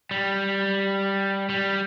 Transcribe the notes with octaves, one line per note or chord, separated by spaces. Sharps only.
G3
G3